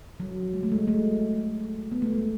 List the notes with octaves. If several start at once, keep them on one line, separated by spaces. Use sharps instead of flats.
F#3
G#3
A3
G#3
A3
B3
A3
G#3